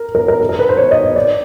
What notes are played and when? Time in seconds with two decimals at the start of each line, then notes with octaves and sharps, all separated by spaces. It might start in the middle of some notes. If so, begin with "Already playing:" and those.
Already playing: A#4
0.15 A#4
0.28 A#4
0.41 A4
0.49 A#4
0.59 B4
0.69 C5
0.77 C#5
0.91 D#5
1.03 C#5
1.16 D5